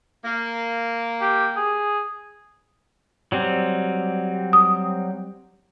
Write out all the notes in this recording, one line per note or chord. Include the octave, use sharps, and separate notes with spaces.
A#3
G4
G#4
F#3 G3 C4
D#6